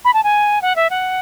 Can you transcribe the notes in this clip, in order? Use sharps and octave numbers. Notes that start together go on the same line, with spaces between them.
B5
A5
G#5
F#5
E5
F#5